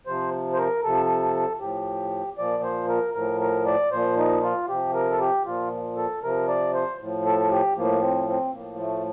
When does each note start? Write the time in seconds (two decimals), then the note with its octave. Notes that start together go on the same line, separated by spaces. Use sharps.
0.06 C3 F3 C5
0.53 C5
0.57 A#4
0.84 C3 F3 A4
1.60 A2 F3 G4
2.38 A#2 F3 D5
2.63 C5
2.88 A#4
3.14 A2 F3 A#4
3.41 A#4
3.66 D5
3.91 A#2 F3 C5
4.17 D#4
4.43 F4
4.68 C3 F3 G4
4.94 A#4
5.11 A4
5.20 G4
5.45 A#2 F3 F4
5.97 A4
6.23 C3 F3 A#4
6.48 D5
6.74 C5
7.00 A2 F3
7.26 A4
7.51 G4
7.76 A2 F3 A#3
8.02 C4
8.28 C4
8.54 A2 F3 A#3
8.80 A3